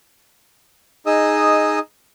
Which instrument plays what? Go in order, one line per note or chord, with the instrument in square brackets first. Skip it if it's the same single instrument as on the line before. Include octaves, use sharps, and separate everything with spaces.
[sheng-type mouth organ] D#4 G#4 D#5 D#6 E6